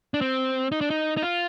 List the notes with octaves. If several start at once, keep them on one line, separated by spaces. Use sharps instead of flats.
D4
C4
D#4
D4
D#4
D#4
F4